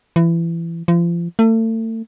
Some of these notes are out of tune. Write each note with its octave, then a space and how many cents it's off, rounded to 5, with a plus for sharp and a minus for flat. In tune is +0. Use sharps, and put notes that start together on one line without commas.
E3 +25
F3 -35
A3 +35